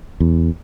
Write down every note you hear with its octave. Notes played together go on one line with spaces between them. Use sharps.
E2